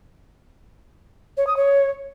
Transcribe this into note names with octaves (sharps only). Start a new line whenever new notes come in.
C#5
D#6
C#5